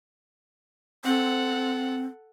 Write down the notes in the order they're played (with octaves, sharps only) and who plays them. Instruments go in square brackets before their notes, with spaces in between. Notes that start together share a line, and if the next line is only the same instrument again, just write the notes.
[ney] C4 [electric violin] A4 F#5